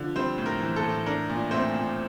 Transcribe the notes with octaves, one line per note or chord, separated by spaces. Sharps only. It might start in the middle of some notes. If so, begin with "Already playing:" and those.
Already playing: D3 F3
G3 C4 C5
A2
A#4
E3
A4
A2
D4 A#4
A#2
A3 C4 C5
A#2